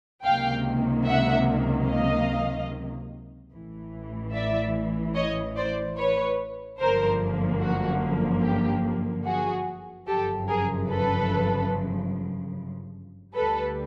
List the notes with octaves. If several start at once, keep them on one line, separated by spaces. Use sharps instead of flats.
C#2 C3 D#3 F#3 A#3 F5 G5
E5 F#5
D#5 F5
A1 A2 E3
D5 E5
C#5 D#5
C5 D5
B4 C#5
G1 F#2 D3 F3 A#3 A#4 C5
F#4
G4
F#4 G#4
G1 F#2 C#3 F3 G4 A4
G#4 A#4
A4 B4
D2 D3 G3 A4 B4